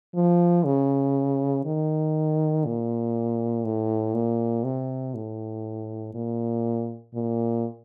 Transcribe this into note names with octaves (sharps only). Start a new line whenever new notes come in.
F3
C#3
D#3
A#2
A2
A#2
C3
A2
A#2
A#2